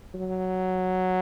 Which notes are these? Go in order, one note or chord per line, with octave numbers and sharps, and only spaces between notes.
F#3